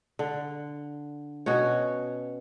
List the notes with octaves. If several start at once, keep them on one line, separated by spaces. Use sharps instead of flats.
D3
B2 C#4 F#4 C#5